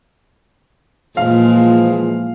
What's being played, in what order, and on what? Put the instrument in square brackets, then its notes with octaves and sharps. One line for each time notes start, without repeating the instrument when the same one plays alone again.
[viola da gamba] A#2 [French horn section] E3 F3 G#3 [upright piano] F5